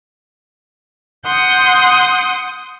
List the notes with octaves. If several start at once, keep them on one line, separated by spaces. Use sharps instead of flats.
F#5 C6 D#6 G6